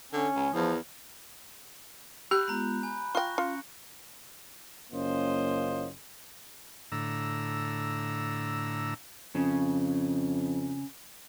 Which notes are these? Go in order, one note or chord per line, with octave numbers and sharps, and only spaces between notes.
D3 C#4
C#2
E2 F3
G4 B5 F#6 G6
G#3 B3 F4 A#5 B5
G#5 B5
F4 G5 C#6 F#6 A#6
C#4 F4 C#7
F#1 A#3 C#4 F4 C5 D#5
A2 D3 A#5 E6
F2 C#3